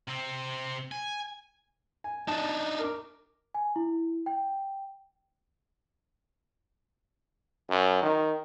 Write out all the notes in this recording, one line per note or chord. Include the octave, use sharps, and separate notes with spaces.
C3 C4
G#5
G#5
D4 D#4 A5
A#4 D6
G#5
E4
G5
F#2
D#3